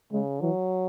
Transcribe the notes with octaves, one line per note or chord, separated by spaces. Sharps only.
C#3 G#3
E3 F#3